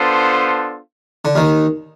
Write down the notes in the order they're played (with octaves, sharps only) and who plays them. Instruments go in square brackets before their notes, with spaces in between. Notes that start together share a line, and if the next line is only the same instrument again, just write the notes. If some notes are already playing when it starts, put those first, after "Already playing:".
Already playing: [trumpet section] B3 D4 F4 A4 C5
[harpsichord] D3
D#2 D#3